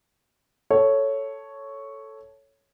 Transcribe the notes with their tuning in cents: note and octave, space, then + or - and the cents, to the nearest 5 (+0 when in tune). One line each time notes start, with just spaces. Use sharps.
A4 +0 C#5 +0